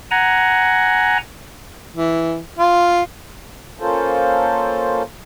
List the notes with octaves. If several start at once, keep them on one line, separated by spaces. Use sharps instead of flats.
F#5 G#5 A#5
E3
F4
A#3 C#4 F4 A4 C5